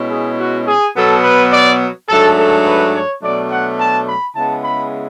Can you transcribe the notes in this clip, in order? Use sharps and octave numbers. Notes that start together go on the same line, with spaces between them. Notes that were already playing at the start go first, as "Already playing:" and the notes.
Already playing: B2 G#3 C#4 E4
G#4
F#4
G#4
B2 F#3 B3 A4
B4
D5
G#2 F#3 A3 D4 A4
A4
B4
C#5
B2 F#3 A3 D4 D5
F#5
A5
B5
C#3 G#3 B3 E4 A5
B5